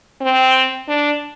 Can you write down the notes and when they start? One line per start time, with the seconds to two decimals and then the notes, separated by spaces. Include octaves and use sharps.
0.22 C4
0.88 D4